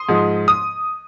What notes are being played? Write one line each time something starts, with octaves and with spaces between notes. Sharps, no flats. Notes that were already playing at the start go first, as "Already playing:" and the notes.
Already playing: C6 D#6
G#2 F3 G#3
D#6